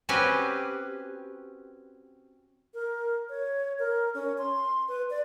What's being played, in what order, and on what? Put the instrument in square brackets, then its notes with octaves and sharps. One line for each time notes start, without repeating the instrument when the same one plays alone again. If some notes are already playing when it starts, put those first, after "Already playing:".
[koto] C4 C#4 F#4 G4 B4 G#5
[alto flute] A#4
C#5
A#4
C#4
C6
B4
D5